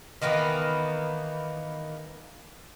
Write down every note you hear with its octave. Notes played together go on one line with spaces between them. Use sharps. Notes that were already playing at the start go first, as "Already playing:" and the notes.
D#3 E3 A#3 B3